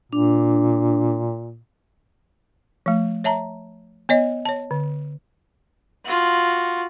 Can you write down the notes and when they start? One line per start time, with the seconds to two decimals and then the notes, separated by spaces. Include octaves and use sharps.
0.13 A#2 D4
2.86 F3 A3
3.24 C#5 E5 A5 A#5
4.09 B3 C#5 D#5
4.45 C#5 A5
4.71 D3
6.05 F4 F#4